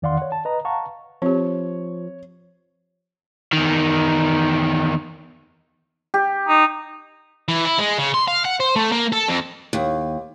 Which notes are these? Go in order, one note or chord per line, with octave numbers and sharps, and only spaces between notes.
E2 D#3 D5 F5 F#5 C6
C#5 F#5
A5
B4 D#5 A#5
F5 F#5 A5 A#5 C#6
F3 C4 G4 C#5
E2 D#3
G4
D#4
E3
E4
G#3
C#3
C6
F5
F#5
C5
A3
A#3
A4
F2
D#2